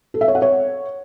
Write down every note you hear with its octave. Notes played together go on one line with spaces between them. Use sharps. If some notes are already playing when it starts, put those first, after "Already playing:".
A4
E5
C#5
F#5
C#5